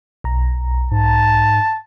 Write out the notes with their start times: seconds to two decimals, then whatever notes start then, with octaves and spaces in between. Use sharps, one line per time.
0.24 B1 A#5
0.91 G#2 A5